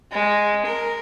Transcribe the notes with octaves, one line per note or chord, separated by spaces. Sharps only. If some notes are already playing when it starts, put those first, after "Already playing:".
G#3
A#4